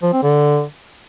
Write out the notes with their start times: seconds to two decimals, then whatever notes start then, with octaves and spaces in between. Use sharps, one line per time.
0.02 F3
0.13 C4
0.23 D3